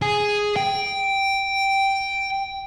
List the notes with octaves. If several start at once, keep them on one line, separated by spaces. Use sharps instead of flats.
G#4
G5